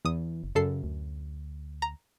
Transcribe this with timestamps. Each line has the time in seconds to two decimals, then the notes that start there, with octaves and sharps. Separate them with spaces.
0.05 E2 E3 D#6
0.44 F#1
0.55 F#2 C#3 A4 C7
0.84 D2
1.82 A#5